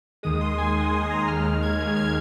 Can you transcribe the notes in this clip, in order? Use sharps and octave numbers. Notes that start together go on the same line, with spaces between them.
D#2 D#3 G#3 D#6
C6
G#5
D#2 D#3 G#3 G#5
G#5
A#5
D#2 D#3 G#3 F6
F6
G#6
D#2 D#3 G#3 G#6
F6